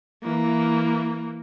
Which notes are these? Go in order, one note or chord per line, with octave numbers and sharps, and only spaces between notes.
E3 A#3